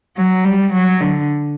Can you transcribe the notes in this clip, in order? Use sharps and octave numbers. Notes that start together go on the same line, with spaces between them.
F#3
G3
F#3
D3